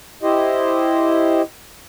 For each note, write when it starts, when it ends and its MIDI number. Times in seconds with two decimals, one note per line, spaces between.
0.23 1.42 64
0.23 1.42 67
0.23 1.42 72
0.23 1.42 75